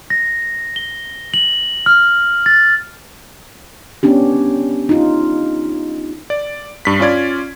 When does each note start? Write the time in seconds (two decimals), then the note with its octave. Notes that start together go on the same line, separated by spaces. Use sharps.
0.10 A#6
0.76 G7
1.34 F#7
1.86 F6
2.46 A6
4.03 B3 C#4 D4 G4
4.89 D#4 F4
6.30 D5
6.85 G2 B6
7.00 C#4 F4 D5 G#6